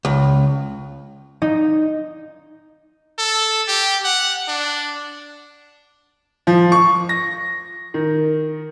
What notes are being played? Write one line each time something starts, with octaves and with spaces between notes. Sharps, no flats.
C#2
D#4
A4
G4
F#5
D4
F3
C#6
A#6
D#3